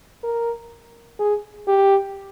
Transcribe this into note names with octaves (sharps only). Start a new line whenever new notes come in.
A#4
G#4
G4